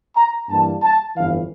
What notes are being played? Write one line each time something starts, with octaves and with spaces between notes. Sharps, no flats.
A#5
G2 E3 G3 A#3 A5
A5
G1 F2 E3 F5